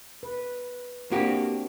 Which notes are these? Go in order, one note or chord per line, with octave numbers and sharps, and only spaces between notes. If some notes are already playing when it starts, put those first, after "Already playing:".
B4
A#3 C4 D4 F#4 G4